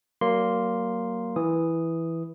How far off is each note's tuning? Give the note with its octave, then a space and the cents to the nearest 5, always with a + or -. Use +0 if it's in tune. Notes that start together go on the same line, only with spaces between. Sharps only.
F#3 +35 A#3 +0 C6 +0
E3 +0 D#6 +0